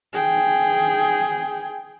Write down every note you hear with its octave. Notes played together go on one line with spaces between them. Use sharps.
G#4 G5